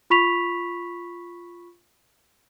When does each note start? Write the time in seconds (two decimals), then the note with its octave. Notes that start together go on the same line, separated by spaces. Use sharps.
0.10 F4 B5 C#6 B6 F7